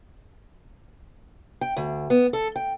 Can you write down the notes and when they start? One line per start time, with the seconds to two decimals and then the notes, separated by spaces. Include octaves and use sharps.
1.61 G5
1.77 D2
2.10 B3
2.33 A4
2.56 G5